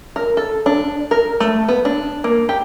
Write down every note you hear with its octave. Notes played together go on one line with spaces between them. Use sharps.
A#4
A4
D4
A#4
A3
B3
D4
A#3
G4